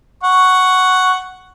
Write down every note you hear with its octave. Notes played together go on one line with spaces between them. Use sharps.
F#5 C#6